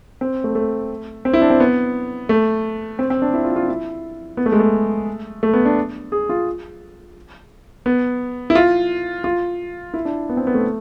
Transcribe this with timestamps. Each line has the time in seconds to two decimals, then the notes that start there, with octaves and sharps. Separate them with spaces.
0.21 C4
0.44 A3
0.55 A3
1.25 C4
1.33 E4
1.42 D4
1.50 C4
1.60 B3
2.29 A3
2.99 C4
3.10 C4
3.22 D4
3.34 E4
3.45 F4
3.56 F4
3.68 E4
4.37 B3
4.46 A3
4.52 G#3
4.60 A3
5.43 A3
5.54 B3
5.65 D4
6.12 G#4
6.29 F4
7.86 B3
8.50 E4
8.55 F4
9.24 F4
9.94 E4
10.05 D4
10.29 B3
10.37 C4
10.47 B3
10.54 A3